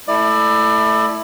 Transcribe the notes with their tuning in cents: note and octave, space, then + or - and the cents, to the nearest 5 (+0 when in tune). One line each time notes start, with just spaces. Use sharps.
A3 -5 E4 +0 D5 +30